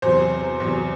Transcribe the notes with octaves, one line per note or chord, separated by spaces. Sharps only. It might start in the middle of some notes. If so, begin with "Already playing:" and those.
E2 C3 F#3 C5
E2 C3 F#3